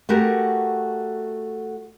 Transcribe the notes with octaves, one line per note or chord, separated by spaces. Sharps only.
A3 F#4 G4 A#4